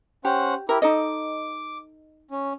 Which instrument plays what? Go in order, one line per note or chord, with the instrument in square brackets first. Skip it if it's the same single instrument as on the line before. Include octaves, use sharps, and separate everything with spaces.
[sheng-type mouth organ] C#4 C5 F#5 [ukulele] G4
[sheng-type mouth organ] E4 G4 [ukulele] A#4
[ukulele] D#4 A4 D#5 [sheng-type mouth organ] D6
[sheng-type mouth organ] C#4